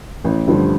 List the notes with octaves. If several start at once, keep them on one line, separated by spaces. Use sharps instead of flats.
A1
G2 D3 F3